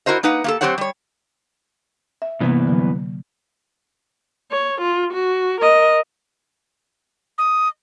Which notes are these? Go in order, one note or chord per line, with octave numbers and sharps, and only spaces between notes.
E4 F#4 A#4 C5 D#5
A#3 D#4 B4 F#5
A#3 G4 A4
F#3 C4 G4 C5 C#5 F#5
G3 C#5
E5
G2 C3 E3 A#3 B3
D3 F#3
C#5
F4
F#4
A#4 D#5
D#6